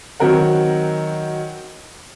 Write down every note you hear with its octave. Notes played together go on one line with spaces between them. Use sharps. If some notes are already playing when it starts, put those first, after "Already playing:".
D#3 F#3 C4 A#4 F#5